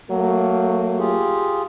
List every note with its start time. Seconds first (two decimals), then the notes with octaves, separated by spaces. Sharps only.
0.10 F#3 A3 A#3
0.99 F4 G4 G#4